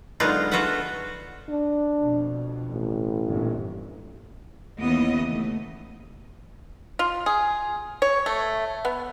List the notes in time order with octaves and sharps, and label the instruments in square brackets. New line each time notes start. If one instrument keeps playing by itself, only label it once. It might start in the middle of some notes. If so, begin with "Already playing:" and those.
[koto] D3 F#3 G#3 B3 D#4 F4
F4 F#4 A4 B4 E5 F#5
[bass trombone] D4
[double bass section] F2 B2
[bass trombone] A1
[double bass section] G1 A#2
[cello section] D#2 C#3 E3 B3 D#5
A3
[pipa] F4
G#4
C#5
A3
B3